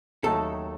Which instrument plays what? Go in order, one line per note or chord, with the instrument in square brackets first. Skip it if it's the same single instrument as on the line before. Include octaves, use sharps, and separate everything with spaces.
[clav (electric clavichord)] D#2 D#3 F#3 A3 D#4 [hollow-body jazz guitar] A4